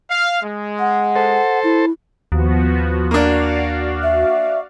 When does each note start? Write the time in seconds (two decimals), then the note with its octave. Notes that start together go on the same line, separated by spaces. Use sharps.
0.10 F5
0.43 G#3
0.79 F#5
1.15 A4 C5
1.64 E4
2.32 D#2 F3 B3 F#4
3.11 A#3 D4 F#4 D5 F5
4.03 E5